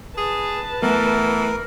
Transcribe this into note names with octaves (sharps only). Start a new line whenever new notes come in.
G#4 B4 A5
E3 A3 B3 A#4